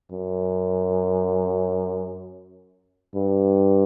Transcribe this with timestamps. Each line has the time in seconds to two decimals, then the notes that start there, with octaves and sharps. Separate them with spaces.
0.12 F#2
3.15 G2